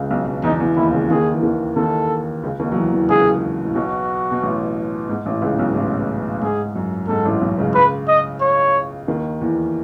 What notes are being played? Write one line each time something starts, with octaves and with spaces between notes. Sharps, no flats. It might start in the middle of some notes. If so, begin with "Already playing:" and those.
Already playing: C#2 C#3
B1 B2
B1 B2
E2 E3 D#4
E2 E3
D#2 D#3 E4
C#2 C#3
D#2 D#3 G#4
E3
D#2 D#3
D#2 D#3 A4
C#2 C#3
D#2 D#3
F#3
E2 E3
E2 E3
C#2 C#3 G#4
A2
B1 B2 F#4
B2
A1 A2
G#2
A1 A2
C#2 C#3
B1 B2
G#2
A1 A2
G#2 G#4
F#2
G#2 A4
A1 A2
B1 B2
C#2 C#3
B4
D#5
C#5
D#2 D#3
E2 E3